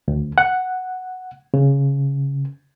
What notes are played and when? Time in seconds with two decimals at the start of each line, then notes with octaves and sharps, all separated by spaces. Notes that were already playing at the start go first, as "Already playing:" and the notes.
0.08 D2
0.38 F#5
1.54 C#3